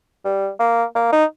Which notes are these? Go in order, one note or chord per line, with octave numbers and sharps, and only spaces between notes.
G3
A#3
A#3
D#4